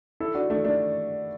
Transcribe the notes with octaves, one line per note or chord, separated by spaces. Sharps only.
E4 A4
D4 F#4
A3 D4
A3 D4